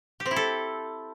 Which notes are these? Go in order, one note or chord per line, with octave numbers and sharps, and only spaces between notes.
G4
C4
E4
A4